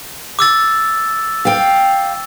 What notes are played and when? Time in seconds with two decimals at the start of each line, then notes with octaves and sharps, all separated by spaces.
0.39 D6 E6 A6
1.45 F5 G5